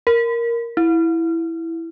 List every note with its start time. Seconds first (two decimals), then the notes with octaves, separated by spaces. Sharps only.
0.07 A#4
0.77 E4